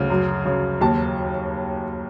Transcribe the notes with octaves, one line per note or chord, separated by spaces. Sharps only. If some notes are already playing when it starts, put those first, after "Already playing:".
Already playing: D2 C#3
F#2
C#3
D#2 A5